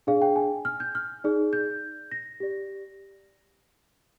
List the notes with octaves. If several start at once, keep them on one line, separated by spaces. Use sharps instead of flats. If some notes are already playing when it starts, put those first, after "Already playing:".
D4 G#4 D5 F5
G5
G#5
F6
G6
F6
D#4 G#4 D5
G6
A#6
G4 D5